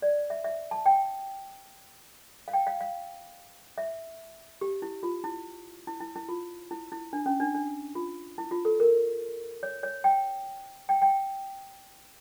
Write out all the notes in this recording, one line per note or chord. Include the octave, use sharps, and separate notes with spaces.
D5
E5
E5
A5
G5
F5
G5
F5
F5
E5
G4
E4
F4
E4
E4
E4
E4
F4
E4
E4
D4
C#4
D4
D4
F4
E4
F4
A4
A#4
C#5
C#5
G5
G5
G5